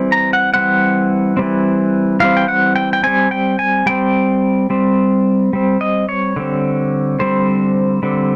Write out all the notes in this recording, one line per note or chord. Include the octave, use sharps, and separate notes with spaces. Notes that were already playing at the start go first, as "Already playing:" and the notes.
Already playing: E3 G3 C4
A#5
F#5
E3 G3 C4 F#5
E3 G3 C4
E3 G3 C4 F5
G5
F#5
G5
G5
G3 C4 G#5
G5
G#5
G3 C4 G5
G3 C4
G3 C4
D#5
C#5
D3 G3 C4
D3 G3 C4 C5
D3 G3 C4